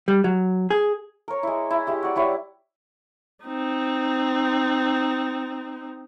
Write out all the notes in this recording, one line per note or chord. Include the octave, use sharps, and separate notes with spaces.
G3
F#3
G#4
A#4 C#5
G#3 E4
E4
G#3 E4 G4
F#4 D5
G3 E4 C#5
C4 D#4